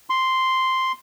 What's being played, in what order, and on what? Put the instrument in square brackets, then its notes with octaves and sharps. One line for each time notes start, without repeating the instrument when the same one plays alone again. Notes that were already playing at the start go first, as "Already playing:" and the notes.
[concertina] C6